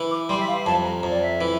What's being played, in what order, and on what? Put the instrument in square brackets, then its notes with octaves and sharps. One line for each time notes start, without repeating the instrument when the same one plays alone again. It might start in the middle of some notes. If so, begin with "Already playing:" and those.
Already playing: [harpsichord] E3
[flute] D6
[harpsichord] G3 [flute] C6
[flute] E5
F5
[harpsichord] F2 [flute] A5
[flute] A#5
[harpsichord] F2
[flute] D5
E5
[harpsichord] E3